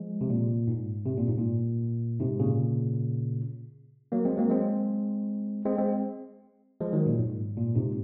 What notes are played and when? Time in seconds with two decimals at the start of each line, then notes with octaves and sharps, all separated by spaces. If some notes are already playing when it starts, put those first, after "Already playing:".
Already playing: F3 G#3
0.21 C3
0.30 A#2
0.67 G#2
1.06 C3
1.17 A#2
1.28 G#2
1.38 A#2
2.20 G#2 C3
2.40 A#2 C#3
4.12 F#3 A#3
4.25 G#3 C4
4.37 F#3 A#3
4.50 G#3 C4
5.65 G#3 C4
5.78 G#3 C4
6.81 F3 G#3
6.93 D#3 F#3
7.06 A#2
7.19 G#2
7.57 A#2
7.75 G#2 C3